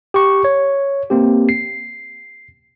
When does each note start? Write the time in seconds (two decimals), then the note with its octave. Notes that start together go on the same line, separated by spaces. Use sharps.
0.14 G4 C#6
0.44 C#5
1.10 A#3 C4 G4
1.49 C7